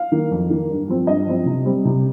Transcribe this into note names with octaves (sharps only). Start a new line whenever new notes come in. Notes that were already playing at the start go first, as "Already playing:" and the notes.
Already playing: F5
D#3 A#3
F2
D#3 A#3
G2
F3 C4
G2 D#5
F3 C4
C3
G3 C4
C3